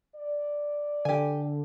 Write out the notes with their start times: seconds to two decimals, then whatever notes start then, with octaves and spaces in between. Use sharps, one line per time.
0.15 D5
1.05 D3 G4 G#5